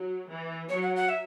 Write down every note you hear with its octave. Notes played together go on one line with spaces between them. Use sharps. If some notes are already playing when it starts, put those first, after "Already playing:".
Already playing: F#3
E3
F#3 C#5
F#5
F#5
E5